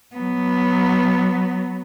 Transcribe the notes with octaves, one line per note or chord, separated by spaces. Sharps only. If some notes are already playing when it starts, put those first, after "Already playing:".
F#3 B3